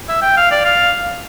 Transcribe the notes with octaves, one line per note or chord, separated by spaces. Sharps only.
E5
G5
F5
D5
F5